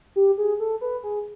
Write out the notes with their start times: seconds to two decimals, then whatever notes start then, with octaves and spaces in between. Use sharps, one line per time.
0.16 G4
0.38 G#4
0.60 A4
0.81 B4
1.03 G#4